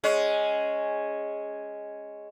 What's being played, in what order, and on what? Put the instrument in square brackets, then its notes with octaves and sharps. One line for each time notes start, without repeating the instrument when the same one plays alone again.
[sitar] G#3 C#4